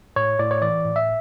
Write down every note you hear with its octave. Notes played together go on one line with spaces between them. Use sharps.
A2 C#5
A2 D5
C#5
E3 D5
A2
E5